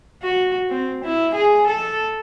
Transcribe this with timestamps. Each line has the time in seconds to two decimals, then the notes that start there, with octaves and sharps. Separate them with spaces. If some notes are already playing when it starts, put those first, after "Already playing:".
0.23 F#4
0.70 C4
1.04 E4
1.35 G#4
1.68 A4